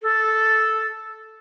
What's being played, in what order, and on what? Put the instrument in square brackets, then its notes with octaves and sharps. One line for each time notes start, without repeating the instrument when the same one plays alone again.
[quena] A4